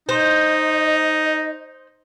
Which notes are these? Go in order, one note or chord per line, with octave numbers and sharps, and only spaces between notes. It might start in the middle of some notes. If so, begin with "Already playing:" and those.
D#4 C5 D#5